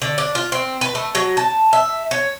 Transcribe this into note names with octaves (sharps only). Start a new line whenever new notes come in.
D3
D4
F4
C4
B4
A3
F#3
A5
E5
C#5